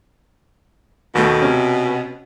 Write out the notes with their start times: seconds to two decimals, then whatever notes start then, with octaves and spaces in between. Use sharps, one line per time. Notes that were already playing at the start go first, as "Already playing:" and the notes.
1.15 D#2 B2 A3
1.42 C3 C#4